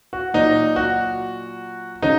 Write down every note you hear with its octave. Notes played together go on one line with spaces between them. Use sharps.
F#4
A#2 F#3 D#4
F#4
C#3 F#3 D#4